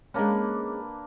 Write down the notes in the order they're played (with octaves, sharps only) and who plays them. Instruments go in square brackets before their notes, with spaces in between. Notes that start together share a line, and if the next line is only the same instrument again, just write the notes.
[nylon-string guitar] G#3 C#4 [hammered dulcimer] A#3 D4 B4